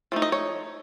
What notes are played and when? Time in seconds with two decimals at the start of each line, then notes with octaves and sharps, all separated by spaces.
0.12 F3 A3 D#4
0.22 D#5
0.32 C#5